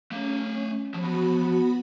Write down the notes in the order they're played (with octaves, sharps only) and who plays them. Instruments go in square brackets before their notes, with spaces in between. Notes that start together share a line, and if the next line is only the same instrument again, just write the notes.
[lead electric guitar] A3 F5 [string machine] C#4
[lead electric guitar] F3 F#3 [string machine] B3 F#4 B5